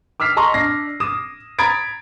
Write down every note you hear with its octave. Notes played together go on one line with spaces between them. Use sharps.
D6 E6 F6 B6 C7
D#5 A5 A#5 C6 C#6 D#6
D4 A#6 C7
D6 D#6 E7
A#5 B5 D#6 G#6 A6 D7